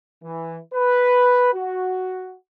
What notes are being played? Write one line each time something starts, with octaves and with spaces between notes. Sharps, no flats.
E3
B4
F#4